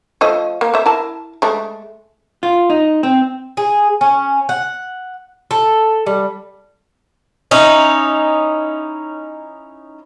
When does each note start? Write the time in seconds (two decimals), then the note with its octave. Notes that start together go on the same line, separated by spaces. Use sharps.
0.21 F3 A3 D#5
0.61 A#3
0.74 A3 E5
0.86 E4 A#4 A5
1.42 G#3 A3
2.43 F4
2.70 D#4
3.03 C4
3.57 G#4
4.01 C#4
4.49 F#5
5.51 A4
6.07 G3
7.51 C#4 D#4 E4